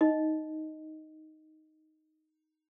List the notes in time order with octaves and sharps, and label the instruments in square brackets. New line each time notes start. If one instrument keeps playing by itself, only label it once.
[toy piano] D#4 D#5